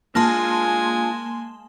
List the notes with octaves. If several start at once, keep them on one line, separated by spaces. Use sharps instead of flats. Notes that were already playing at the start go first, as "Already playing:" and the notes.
G#3 A#3 D4 F4 G#5 A5 C6